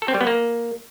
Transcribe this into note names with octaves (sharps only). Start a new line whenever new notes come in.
A4
C4
G3
B3
A#3